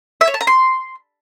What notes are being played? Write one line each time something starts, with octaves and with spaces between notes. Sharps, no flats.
E5
C#5
A5
A#5
C6